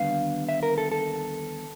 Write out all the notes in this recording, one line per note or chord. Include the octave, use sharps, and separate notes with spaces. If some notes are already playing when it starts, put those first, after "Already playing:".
Already playing: D#2 D3 G3 B3 D4 F5
E5
A#4
A4
A4